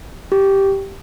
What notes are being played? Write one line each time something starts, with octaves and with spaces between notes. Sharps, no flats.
G4